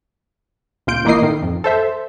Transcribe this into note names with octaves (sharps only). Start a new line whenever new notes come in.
C#2 A#2 F4 G6 D7
A1 E3 A#3 E4 D#5 C7
A2 D#3
F2
A4 C5 E5